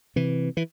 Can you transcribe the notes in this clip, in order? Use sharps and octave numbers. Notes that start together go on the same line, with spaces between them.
C3 E3
E3